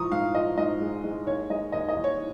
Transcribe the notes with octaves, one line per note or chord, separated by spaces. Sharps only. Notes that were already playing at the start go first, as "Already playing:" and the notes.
Already playing: G#2 F3 A#5 C#6 D#6
G#2 F5
F3 D#5
G#2 D#5
G#3
G#3
D#2 C#5
G#3 D#5
D#2 D#5
D#5
D#2
C#5